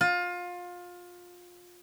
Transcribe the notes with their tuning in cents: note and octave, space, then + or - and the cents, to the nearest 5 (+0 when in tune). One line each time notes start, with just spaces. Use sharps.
F4 +25